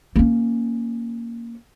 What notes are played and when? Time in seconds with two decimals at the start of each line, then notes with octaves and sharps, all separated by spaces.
0.16 A#3 C#4